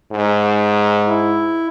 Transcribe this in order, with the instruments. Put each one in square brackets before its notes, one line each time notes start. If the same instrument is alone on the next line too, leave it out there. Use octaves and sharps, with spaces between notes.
[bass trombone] G#2
[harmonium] E4